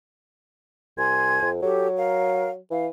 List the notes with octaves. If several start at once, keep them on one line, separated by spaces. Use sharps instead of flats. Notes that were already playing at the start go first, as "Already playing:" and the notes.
C2 G#5 C6 G#6
F2
F#3 G4 A4
A#4 F5
E3 F5